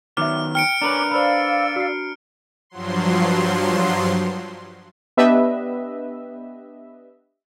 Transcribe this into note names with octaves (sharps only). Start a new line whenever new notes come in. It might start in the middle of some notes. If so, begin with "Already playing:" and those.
D#3 F#3 B3 E5 D6 F6
G5 F6 C#7 D7
C#4 D4 A#4 B4 A#5 D6
C5 D5 F5 B5 E6
F#4 C7
G2 F3 F#3 C6
B3 D4 G4 B4 D#5 E5